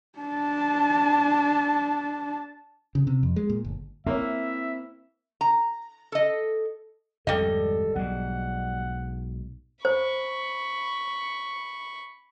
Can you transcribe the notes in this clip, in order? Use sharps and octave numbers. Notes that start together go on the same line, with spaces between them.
D4 A5
C#3
C3
F2
G#3
A#2
G1
A#3 C4 E4 C#5 E5
A#5
A4 D#5
G#1 F2 G#2 G3 A4 D#5
B1 G#2 F#5
C5 B5 C#6